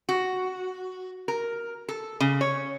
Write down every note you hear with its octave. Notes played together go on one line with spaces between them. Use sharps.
F#4
A#4
A4
C#3
C#5